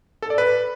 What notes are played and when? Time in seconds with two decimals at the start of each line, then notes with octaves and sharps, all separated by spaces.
0.22 A4
0.30 D5
0.38 B4